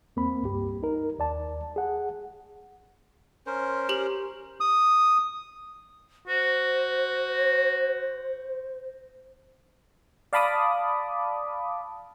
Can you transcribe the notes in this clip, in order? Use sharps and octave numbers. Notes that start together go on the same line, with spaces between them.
E2 A#3 C4 B5
C#2 G2 G4
D#4 A#4
D#2 D5 A5
G#4 F#5
C#4 A#4 C5
G4 F#7
D#6
F#4 C5
D5 F5 A5 B5 D6 D#6